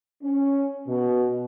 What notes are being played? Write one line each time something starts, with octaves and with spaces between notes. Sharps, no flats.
C#4
B2